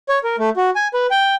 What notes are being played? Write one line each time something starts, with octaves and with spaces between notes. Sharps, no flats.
C#5
A#4
A3
F#4
G#5
B4
G5